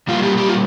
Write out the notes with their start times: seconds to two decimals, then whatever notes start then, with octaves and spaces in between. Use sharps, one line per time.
0.07 A#2 G3 A#3 F4
0.23 G4
0.38 G4
0.48 F4